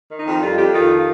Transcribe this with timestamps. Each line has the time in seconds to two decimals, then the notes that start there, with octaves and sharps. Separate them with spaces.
0.10 D#3
0.18 D#4
0.26 F2
0.42 G3 F4
0.57 F2 G4
0.74 D#3 F4
0.90 F4